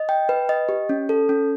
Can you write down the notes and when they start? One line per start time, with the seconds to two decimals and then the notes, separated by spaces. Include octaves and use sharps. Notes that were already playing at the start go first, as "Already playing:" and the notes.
Already playing: D#5
0.09 G5
0.29 B4
0.49 D#5
0.69 G4
0.89 C#4
1.09 A4
1.29 C#4